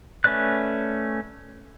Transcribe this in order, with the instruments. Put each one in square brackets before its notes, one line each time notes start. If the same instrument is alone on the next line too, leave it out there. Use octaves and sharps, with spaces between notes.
[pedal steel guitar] A3 C#4 B4 D5 F#6